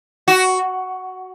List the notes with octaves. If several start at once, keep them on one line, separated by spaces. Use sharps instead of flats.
F#4